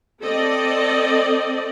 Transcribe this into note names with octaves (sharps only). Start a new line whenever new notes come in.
C4 A4 D5 D#5